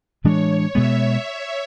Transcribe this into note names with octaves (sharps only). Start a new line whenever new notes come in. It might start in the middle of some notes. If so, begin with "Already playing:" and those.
A2 E3 G#3 D4 C#5
B2 G#3 B3 E5